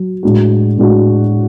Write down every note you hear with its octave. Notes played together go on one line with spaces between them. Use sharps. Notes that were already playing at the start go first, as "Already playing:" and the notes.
Already playing: F#3
A2 G#3 D4 F#4
A2 G#3 D4 F#4